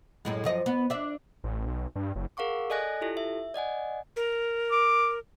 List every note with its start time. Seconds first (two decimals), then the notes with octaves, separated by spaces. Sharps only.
0.25 F#2 A2 G#3
0.44 F#2 F3 D#5
0.66 B3
0.90 D4 E5
1.44 A1
1.67 B1
1.95 G2
2.16 F#1
2.37 G#4 A#4 F5 F#5 C#6 D6
2.70 A4 D5 D#5 G#5 F#6 A#6
3.01 E4 F4 G4 A4
3.17 E5
3.54 D5 D#5 F#5 G#5
4.16 A#4
4.71 D6